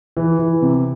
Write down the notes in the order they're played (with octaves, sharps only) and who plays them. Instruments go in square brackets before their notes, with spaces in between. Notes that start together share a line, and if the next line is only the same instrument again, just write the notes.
[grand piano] E3
E3
C3